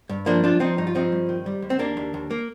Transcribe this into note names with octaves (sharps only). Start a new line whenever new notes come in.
G2
F3 A#3 D4
F3 D4 F4
F3 C4 D#4
G2 D#4
F4
F3 C4 D#4
G2
D#3
G3
D#2
C4
D#2 A#3 D4
D#2
D#2
A#3